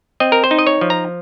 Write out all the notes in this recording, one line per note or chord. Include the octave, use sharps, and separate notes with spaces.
C4 D#5
A#4
C5
D#4
D#5
C#5
F3
A#5